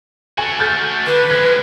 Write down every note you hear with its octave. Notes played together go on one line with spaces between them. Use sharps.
A3 F#4 G#5
F6 G6 A6
D3 B4
F3 G#3 G#6